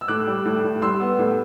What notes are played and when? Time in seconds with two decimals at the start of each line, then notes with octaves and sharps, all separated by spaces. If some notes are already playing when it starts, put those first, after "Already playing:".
0.01 E6
0.08 A2 D6 F#6
0.27 G3
0.45 A2
0.64 A2
0.82 G3 C6 E6
1.00 B3
1.19 A2